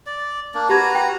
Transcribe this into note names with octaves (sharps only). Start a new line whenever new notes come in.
D5
A#3 D4
F#4 G4 B4 A#5 G#6
G5